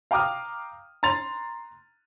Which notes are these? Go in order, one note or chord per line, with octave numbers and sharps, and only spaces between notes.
F5 G5 A#5 D6 D#6 F6
A#5 C6 A6 F7